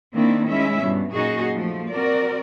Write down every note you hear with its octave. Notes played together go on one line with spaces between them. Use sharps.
D#3 A#3 C4 D4 E4
G#3 C#4 E4 E5
G2 B2
F#2 A#2 D#4 F#4 G#4
F3 A3
C4 F#4 A#4 D5